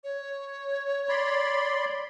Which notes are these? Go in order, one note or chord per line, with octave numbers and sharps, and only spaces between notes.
C#5
D5 B5 C6